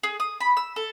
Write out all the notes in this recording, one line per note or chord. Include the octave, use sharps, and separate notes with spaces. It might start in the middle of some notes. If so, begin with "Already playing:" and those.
G#4
D#6
B5
E6
A4